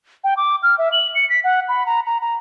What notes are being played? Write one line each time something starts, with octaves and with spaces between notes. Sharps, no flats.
G5
D6
F6
E5
F#7
C#7
B6
F#5
B5
A#5
A#5
A#5